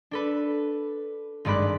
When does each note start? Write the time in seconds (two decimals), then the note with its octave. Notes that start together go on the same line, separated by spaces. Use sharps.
0.11 D4 A4 B4
1.45 G#1 G2 G#3 D5 B5 F#6